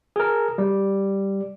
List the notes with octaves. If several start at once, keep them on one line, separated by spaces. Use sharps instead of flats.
G#4 A#4
G3